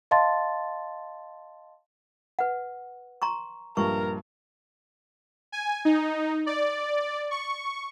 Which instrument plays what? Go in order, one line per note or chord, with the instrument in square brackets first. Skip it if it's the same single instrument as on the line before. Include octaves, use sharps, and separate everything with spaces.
[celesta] D#5 F5 A5 C6 A6
[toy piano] B4 F#5
A#5 C6 C#6
[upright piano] A#1 G2 A#2 [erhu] A#4 [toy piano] C#6
[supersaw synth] G#5
D#4
D5
C#6